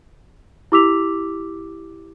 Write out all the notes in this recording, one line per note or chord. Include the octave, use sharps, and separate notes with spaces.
E4 G4 D6 E6 B6 F7